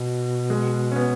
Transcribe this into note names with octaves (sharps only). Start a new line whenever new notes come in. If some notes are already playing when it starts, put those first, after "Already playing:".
Already playing: B2
G#3
C#4
B3